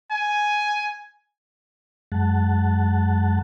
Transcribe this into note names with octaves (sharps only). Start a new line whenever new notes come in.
G#5
F#2 G#3 F#5 A5